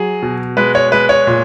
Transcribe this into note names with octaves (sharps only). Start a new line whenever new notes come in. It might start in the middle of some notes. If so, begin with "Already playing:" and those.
Already playing: F#3 G#4
B2
G#3 B4
C#5
G#3 B4
C#5
A#2